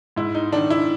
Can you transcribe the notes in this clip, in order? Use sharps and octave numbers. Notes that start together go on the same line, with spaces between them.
G#2 E4
D#4
D#3 D4
E4